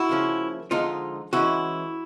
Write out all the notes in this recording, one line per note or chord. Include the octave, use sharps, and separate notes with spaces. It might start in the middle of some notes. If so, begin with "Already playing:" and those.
Already playing: E4 F#4
C#3 F3 A#3 C#4
D3 F3 G#3 D#4 F4
E3 G#3 C#4 E4 F#4